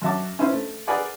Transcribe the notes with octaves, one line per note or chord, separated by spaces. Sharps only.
F#2 F#4 E5 A5 D6
C#4 E4 B4 C5 E5
A3
G#4 A#4 B4 D5 F#5 G#5